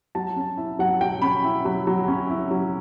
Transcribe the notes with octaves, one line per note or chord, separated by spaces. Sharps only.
F#3 A5
C#4
E4
F#3 F#5
F#3 G5
C#4 B5
E4
F#3
F#3
C#4
E4
F#3